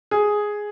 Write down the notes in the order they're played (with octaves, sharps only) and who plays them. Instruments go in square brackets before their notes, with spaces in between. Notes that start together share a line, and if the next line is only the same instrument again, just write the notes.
[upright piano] G#4